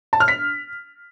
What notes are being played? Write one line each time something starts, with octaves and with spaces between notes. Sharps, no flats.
A5
F6
B6